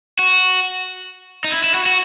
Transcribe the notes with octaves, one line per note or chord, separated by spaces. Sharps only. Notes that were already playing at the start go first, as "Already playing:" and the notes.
F#4
D#4
E4
E4
F#4
F#4